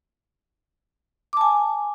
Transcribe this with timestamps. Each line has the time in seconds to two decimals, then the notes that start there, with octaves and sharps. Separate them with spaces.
1.33 D6
1.37 A5
1.41 G#5